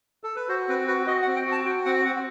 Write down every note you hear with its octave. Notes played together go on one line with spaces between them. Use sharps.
A4
B4
F#4 C5
C4 B4
F#4 B4
F#4 D#5
F#5
C4
G5
F#4
A5
F#4 G5
C4 F#5
C4 F#5